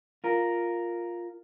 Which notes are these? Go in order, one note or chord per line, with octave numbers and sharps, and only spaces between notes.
F4 A#4